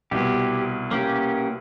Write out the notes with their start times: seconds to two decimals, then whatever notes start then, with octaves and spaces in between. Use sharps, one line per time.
0.11 C2 B2 G4
0.91 A#3 C#4 G4